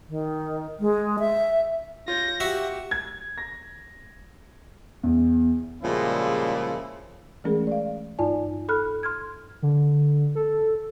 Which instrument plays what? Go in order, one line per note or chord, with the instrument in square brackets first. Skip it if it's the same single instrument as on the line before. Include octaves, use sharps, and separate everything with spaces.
[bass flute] D#3
G#3
E5
[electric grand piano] F4 C#5 [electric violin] G6 A#6
[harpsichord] F#4 E5 [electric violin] G4
[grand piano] G#6
A#6
E2
[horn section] A#2 C#3 F3 G3 G#3 E4
[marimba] E3 G#3 A3 C#4 G#4 A#4
D5 F5
G2 D#4 F4 D5 G#5 A5
A4 B5 F6 F#6
C6 F6 G#6
[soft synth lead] D3
A4